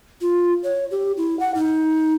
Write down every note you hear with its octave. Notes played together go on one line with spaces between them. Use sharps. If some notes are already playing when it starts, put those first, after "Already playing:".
F4
C#5
G4
E4
F#5
D#4